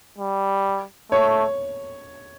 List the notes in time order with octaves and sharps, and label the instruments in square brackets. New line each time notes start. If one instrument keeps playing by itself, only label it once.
[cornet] G3
[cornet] A3 [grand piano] C#5